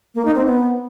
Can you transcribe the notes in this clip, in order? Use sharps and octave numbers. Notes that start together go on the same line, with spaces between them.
A#3
D#4
C4
B3